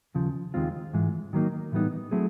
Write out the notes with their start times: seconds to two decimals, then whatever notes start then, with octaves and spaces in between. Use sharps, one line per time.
0.15 D#2 C#3 F3
0.54 D#2 D#3 G#3 C4 F4
0.93 G#2 E3 G#3
1.33 D#3 F#3 A#3 D#4
1.72 A2 E3 G3 B3 D#4
2.11 F#3 A3 C4 E4 G#4